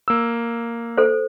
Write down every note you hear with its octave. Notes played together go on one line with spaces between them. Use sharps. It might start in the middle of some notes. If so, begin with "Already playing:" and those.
A#3 E6
A4 C5